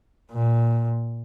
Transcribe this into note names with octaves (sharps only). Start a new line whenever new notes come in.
A#2